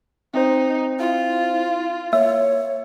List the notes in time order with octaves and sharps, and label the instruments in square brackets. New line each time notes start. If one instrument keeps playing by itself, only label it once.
[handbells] C4 C5 [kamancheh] D#4
[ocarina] E4 [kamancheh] F4
[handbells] A#3 [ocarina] C#5 [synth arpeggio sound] E5